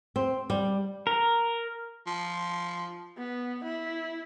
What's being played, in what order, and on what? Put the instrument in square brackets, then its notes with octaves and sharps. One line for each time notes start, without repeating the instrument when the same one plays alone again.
[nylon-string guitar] C4
G3
[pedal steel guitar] A#4
[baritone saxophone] F3
[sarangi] B3
E4